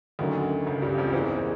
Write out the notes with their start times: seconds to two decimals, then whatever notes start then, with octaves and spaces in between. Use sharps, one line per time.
0.19 D2 D3 D#3 F#3 A#3 C#4
0.66 C#2 C#3
0.82 G2 G3
0.97 F2 F3
1.13 E2 E3 A#3 D#4 G#4 C5